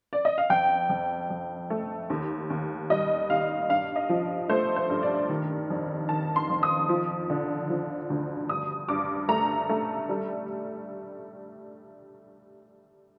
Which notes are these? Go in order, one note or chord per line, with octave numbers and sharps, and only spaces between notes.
D5
D#5
F5
F2 G5
F2
F2
A3
D#2
D#2
G3 D#5
D#2 F5
G2 F5
D#5
F3
A3 C5
C5
G2
D5
D#3
F2
D#3 A5
C6
F2
D#6
F3
D3
F3
D2
G2 D#6
G2 D6
A3 A#5
A3
G3